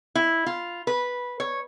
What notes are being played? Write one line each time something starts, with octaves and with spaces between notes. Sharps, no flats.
E4
F4
B4
C#5